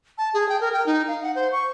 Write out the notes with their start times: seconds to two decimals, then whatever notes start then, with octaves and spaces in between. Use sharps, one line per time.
0.18 A5
0.34 G#4
0.49 G5
0.61 A#4
0.73 G5
0.86 D#4
1.08 F5
1.23 F#5
1.35 C5
1.52 C#6